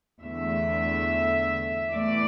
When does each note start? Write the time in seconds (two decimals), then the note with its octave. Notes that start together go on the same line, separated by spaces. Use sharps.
0.21 E2 D3 A3 E5
1.92 E2 E3 A3 D5